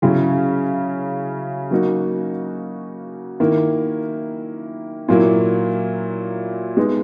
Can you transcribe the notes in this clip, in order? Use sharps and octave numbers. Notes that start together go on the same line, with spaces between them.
C#3 F#3 C#4 E4
F#3 A#3 D#4 F#4
D#3 A#3 E4
A#2 F#3 A#3 E4
G#3 B3 D#4